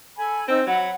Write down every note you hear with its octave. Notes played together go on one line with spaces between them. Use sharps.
A4 G#5 B5
C4 D#4 E6
F#3 C#5 F#5 B5